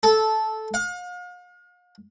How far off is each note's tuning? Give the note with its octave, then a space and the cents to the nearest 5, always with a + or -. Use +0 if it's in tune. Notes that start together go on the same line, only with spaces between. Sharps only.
A4 -10
F5 +40